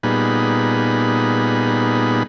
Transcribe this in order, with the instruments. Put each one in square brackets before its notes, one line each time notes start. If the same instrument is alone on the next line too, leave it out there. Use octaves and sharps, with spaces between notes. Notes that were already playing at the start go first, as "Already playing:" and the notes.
[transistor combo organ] A#2 G3 B3 D#4 G#4 B5